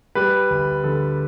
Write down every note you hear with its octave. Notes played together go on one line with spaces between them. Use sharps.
G3 B4
D2
D3 A4